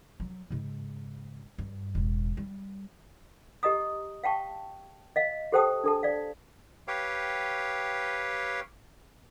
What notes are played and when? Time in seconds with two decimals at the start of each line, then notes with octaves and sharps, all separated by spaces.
0.20 F#3
0.50 G#2 C#3
1.58 G2
1.95 E1 A1
2.37 G3
3.63 G4 D#5 A#5 D#6
4.23 F5 G5 A5 C#6
5.16 D#5 F5
5.52 G4 A4 C5 G5 A5 D#6
5.84 D4 A4 A5
6.03 D5 F5
6.88 G4 B4 C#5 F5 G5